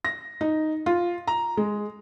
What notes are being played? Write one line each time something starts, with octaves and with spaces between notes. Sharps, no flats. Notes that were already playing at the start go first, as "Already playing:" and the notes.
A#6
D#4
F4
A#5
G#3